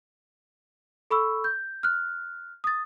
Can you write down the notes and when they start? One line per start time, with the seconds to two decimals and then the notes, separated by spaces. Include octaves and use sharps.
1.11 A4 B5 C#6 E6
1.44 G6
1.83 F6 F#6
2.64 D#6 A6